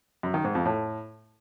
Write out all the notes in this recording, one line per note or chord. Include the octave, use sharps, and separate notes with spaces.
F#2
D#3
G#2
F2
A2